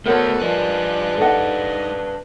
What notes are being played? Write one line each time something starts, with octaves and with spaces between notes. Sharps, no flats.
A3 B3 F#4 A4 A#4 C5 C#5 F#5
F3 G#3 D4 B4 F#6
G#2 A4 D#5 F#5